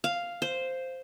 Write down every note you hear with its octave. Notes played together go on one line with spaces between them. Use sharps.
F5
C5